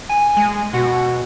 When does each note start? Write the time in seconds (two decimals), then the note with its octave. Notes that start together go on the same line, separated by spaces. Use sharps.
0.10 G#5
0.37 G#3
0.73 B2 F#4